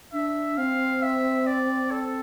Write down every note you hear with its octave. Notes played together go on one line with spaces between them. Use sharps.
D4 E5
C4 F5
E5
D5
A4